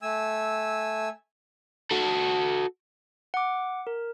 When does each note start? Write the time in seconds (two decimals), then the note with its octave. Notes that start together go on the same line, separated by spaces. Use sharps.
0.02 A3 G#5 E6
1.91 F#4 A4
3.34 F#5 D6
3.87 A#4